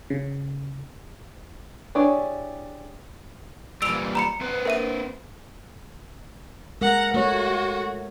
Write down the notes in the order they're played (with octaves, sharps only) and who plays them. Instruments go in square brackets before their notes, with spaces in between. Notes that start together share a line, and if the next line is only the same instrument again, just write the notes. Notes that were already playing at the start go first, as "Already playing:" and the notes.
[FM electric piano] C#3
[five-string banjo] D4 E4 G4 G#4 C#5
[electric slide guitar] A#2 E3 G3 [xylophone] E6 D7 F7
[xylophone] A#5 B5 C#7
[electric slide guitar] C4 B4 C5
[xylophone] A#4 E5 D#7
[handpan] G#3 A#4 [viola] F#5 A#5
[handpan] A3 C#5 [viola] F#4